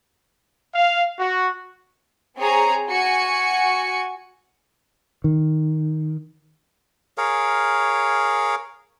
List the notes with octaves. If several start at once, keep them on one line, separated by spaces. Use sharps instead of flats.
F5
F#4
C4 G#4 C#5 G#5 A#5
F#4 G#5 C#7
D#3
G#4 A#4 C#5 F5